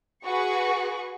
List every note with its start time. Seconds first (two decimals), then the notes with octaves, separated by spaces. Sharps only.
0.24 F#4 G#4 B4 C#6